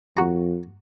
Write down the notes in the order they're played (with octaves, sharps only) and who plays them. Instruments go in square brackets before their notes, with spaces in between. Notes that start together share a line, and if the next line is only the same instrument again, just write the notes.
[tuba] F2 [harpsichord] F#4 A#5